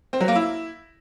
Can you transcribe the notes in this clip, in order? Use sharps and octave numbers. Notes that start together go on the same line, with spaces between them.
C4
F#3
A#3
E4